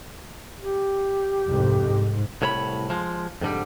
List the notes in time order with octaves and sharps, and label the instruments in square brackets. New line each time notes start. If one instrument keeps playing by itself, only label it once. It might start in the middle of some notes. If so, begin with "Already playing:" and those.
[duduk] G4
[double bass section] C2 F2 G#2
G#2
[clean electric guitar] C2 A2 C#5 A#5 B5
F3 G#3
F2 G#2 D3 G3